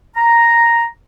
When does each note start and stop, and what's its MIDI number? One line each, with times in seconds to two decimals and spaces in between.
0.15 0.85 82